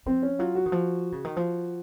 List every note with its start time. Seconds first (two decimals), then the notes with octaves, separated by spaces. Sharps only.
0.06 F3 C4
0.22 C#4
0.39 F#3 F4
0.55 F#4
0.66 D#3
0.72 F3
1.12 C#3
1.25 D#3
1.37 F3